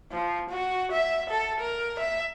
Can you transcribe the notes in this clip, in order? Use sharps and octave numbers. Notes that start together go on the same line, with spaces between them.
F3
F#4
E5
A4
A#4
E5